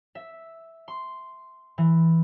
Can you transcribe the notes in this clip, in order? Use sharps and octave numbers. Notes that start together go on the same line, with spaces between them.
E5
C6
E3